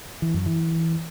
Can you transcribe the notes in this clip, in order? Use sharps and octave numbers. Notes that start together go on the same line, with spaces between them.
E3
F#2
E3